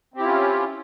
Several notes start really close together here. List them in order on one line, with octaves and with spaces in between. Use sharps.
C4 G4 E4 F4 C#4